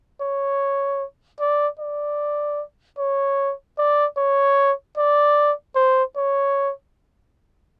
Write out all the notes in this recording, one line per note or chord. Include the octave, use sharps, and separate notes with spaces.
C#5
D5
D5
C#5
D5
C#5
D5
C5
C#5